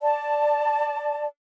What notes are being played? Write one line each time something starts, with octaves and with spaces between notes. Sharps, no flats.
D5 A5